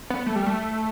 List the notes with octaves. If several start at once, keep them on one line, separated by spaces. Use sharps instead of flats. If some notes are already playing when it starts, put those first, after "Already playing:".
B3
A3
G3
A3